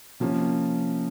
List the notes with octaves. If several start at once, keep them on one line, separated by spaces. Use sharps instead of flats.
C3 F3 A#3 C#4